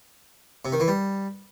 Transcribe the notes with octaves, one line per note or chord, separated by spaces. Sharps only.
C3
D#3
E3
G3